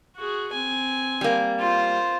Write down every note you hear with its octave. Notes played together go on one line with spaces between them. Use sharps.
F#4 G#4
C4 G#5
G3 A#3
F4 C5